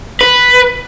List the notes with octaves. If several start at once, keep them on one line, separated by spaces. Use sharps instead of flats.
B4